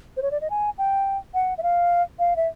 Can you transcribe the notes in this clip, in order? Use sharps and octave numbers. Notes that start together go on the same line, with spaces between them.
C5
C#5
D5
D#5
G#5
G5
F#5
E5
F5
F5
E5